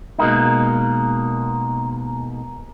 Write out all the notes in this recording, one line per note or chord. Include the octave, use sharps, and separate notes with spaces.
B2 G#3 A#3 D#4